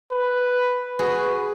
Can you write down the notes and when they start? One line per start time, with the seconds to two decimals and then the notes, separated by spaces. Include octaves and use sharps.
0.11 B4
0.99 F#4 G#4 B4